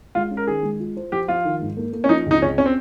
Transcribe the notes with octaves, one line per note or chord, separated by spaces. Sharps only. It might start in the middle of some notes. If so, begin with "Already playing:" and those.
G#3 F4
C#4
A#4
D#3 G#4
G#3
F4
C5
F3 G4
F3 F4
D#3
G#2
A#3
A#3
C#4
F3 D#4
C#2 D#4
C#2 C#4
C#4
C4